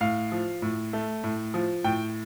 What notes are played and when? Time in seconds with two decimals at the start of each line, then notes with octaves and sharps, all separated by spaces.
0.01 A2 F5
0.32 F3
0.62 A2
0.93 A3
1.24 A2
1.54 F3
1.84 A2 G5